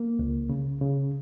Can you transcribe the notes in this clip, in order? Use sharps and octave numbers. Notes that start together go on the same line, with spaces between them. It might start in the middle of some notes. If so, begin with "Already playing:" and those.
Already playing: A#3
C#2
C#3
C#3